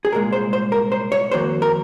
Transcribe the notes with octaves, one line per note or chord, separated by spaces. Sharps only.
G#4
C2 A#2 G#3 A#4
C5
C5
A#4
C5
C#5
F2 D#3 F#3 A#3 C5
A#4